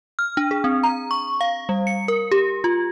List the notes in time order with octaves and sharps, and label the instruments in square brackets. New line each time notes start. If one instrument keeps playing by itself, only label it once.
[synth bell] F6
D4
G#4
C4
A#5
C#6
F5
G3
C#7
A#4
G4
F4